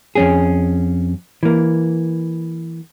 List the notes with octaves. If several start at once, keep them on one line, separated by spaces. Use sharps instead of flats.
F2 C#4 G#4
E3 A#3